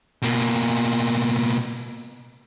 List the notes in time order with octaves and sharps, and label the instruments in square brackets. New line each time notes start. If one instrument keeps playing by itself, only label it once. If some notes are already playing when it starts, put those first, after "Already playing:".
[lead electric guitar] B2 A#3